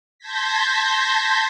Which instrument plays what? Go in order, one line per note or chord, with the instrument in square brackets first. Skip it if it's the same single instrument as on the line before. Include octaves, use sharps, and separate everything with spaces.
[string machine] A5 C6 G6 G#6 A#6 B6